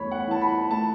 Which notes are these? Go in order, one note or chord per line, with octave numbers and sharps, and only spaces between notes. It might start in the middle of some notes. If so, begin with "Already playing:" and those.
Already playing: E2 A3 C#5 B5
F#5
E3 A5
B5
A3 A5